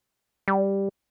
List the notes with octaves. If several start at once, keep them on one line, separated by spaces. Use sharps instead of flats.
G3